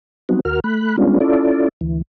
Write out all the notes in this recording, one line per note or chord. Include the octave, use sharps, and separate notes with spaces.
F#3 G3 B3 C4 D#4 F#4
D#2 F#4 A#4 F6
A3 B5 F#6
G3 G#3 B3 C#4 D4 F4
C#4 E4 F4 A4 D5
D2 E3